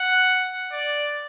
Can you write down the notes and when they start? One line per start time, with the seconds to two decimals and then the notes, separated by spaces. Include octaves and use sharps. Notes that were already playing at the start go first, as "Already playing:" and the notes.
Already playing: F#5
0.73 D5